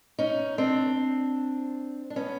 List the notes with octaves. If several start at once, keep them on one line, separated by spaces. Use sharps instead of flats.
C#4 D#4
C4 D4
D4
B3 C#4